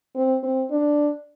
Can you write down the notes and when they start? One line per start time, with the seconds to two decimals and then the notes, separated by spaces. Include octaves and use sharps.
0.16 C4
0.43 C4
0.71 D4